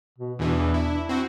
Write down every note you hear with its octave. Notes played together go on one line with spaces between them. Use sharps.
B2
E2 B2 E3 D4
E4
C4 F#4